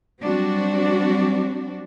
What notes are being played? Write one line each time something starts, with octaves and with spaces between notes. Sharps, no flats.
F#3 G3 C4 D4 F#4